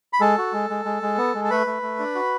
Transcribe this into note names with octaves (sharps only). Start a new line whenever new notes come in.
B5
G#3 A4 A5
F#4
G#3
G#3
G#3
G#3
B3
G#3
A5
A3 B4 B5
A3
A3
D4
F#4